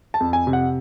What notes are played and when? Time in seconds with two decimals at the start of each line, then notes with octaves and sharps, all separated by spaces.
0.14 A5
0.20 F2
0.33 G#5
0.47 C3
0.53 F#5